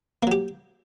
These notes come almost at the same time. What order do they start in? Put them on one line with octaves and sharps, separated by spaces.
A#3 F#3 G4